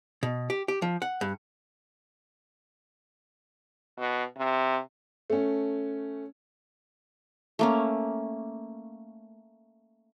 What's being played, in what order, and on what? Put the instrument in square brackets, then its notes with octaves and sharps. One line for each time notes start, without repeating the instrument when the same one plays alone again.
[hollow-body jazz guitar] B2
G4
G4
F3
F#5
G2
[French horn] B2
C3
[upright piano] A3 C#4
[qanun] A3 A#3 C#4